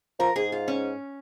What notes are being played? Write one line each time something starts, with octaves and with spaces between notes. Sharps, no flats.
F3 A#4
G#2 G#4
F4
C#4